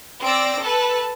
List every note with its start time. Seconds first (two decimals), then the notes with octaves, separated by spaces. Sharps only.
0.22 C4 D5 E6 A#6 D7
0.61 A4 B4 A5